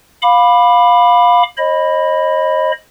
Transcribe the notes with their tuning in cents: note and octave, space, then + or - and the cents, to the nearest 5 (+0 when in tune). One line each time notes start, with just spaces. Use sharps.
F5 +20 B5 +0 D6 +20
C5 +45 D#5 +0 B5 +0